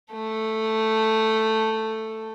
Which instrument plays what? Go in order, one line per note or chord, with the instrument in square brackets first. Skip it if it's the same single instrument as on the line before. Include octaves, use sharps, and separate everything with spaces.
[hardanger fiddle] A3 A4